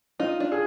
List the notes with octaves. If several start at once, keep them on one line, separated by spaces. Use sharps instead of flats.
D#4 F4
D4
G#4